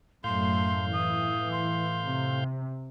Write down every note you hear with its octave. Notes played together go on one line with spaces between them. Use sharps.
F#2 A2 A3 F5 C6 G6
E3 D#6
C6
C3